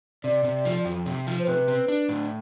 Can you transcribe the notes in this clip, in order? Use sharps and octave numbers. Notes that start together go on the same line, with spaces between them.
C3 D5
C3
F3
F2
C3
F3
C5
C3 B4
C4
D4
A2